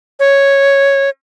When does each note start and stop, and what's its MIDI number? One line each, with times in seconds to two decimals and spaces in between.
0.20 1.09 73